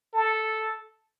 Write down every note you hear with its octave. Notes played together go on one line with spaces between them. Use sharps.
A4